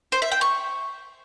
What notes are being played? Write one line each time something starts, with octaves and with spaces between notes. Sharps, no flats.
C5
E5
G5
C#6